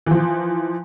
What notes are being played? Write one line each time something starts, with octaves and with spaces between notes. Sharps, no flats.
E3 F3